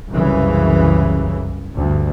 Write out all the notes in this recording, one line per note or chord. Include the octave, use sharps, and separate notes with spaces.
C2 F#2 C#3 E3
D2 G2